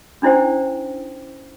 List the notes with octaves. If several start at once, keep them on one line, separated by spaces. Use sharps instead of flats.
C#4 D4 E4 C5 G5